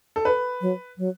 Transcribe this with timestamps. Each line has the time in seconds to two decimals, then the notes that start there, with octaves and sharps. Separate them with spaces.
0.16 A4
0.25 B4
0.61 F#3
0.98 F#3